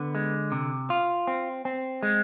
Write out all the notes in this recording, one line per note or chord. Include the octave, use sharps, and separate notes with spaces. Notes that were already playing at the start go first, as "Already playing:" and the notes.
Already playing: D3 B3
G#3
C3
F4
C4
C4
G#3